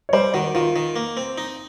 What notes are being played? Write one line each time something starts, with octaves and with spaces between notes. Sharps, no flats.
C#5
G3 C5
D#3 F#4
D#3 F4
D#3
A#3
C4
D#4